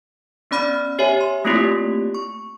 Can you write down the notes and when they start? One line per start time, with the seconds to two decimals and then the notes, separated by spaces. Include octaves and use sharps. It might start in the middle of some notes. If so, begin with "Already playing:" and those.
0.51 B3 C#4 D5 B5 F6
0.99 G4 C#5 E5 G#5
1.21 C6
1.45 A3 A#3 C4 E4 F4 G4
2.14 C#6